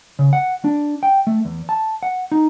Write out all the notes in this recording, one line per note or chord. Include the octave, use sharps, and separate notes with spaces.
C#3
F#5
D4
G5
A3
E2
A5
F#5
D#4